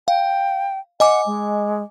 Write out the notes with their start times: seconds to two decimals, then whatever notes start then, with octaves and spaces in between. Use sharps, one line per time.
0.08 F5 G5
1.00 D#5 F#5 G#5 D6
1.26 G#3